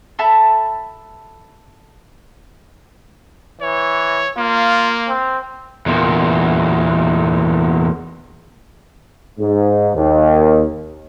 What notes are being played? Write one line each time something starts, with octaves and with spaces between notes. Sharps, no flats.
A4 E5 A5 B5
E3 C#5
A#3 F4
C4
E2 A#2
G#2
D#2